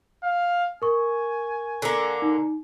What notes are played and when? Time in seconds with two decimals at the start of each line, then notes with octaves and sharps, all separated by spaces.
0.24 F5
0.82 A#4 G#5 C#6
1.82 D3 A#3
2.22 D#4